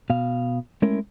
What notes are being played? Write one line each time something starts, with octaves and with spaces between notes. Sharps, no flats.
B2 F5
G#3 A3 C#4 E4 A#4